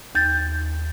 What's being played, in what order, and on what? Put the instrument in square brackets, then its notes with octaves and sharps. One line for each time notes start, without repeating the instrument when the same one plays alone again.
[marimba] D#2 G6 A6